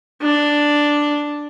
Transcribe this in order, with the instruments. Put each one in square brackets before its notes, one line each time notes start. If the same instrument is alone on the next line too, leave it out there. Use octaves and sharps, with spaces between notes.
[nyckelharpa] D4